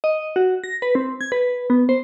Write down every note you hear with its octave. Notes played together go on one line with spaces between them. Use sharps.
D#5
F#4
A#6
B4
C4
G#6
B4
B3
C5